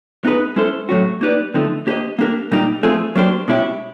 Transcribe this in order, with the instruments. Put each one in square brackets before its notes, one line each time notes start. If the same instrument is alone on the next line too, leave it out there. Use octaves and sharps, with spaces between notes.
[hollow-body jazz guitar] B3 D#4 G#4 B4
G#3 C#4 E4 A4 C5
A2 F#3 A3 C#4 F#4
A#3 D#4 G4 B4 D5
D3 F3 A3 C4 D#4
A#3 D4 G4 C5 D#5
A#3 D4 G4 A#4
A#2 G3 A#3 D#4 G4
F3 A3 C4 F4 G#4
F#3 A#3 D4 G4 C5
B2 G#3 C#4 E4 G4